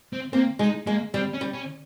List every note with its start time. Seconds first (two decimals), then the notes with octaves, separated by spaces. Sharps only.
0.13 C4
0.33 A#3 C4
0.59 G#3 D#4
0.87 G#3 A#3
1.14 G3 C4
1.33 C#4
1.41 G3
1.54 C#4